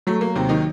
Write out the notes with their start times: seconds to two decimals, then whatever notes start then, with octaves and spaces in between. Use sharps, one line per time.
0.07 F#3 A3
0.21 A#3
0.35 D#2 C3 C4
0.49 D#3 D#4